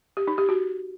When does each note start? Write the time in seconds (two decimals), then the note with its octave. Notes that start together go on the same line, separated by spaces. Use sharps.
0.17 G4
0.27 D#4
0.38 G4
0.49 F#4